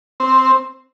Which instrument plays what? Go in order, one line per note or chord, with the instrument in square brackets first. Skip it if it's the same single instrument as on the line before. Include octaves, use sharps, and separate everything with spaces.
[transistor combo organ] C4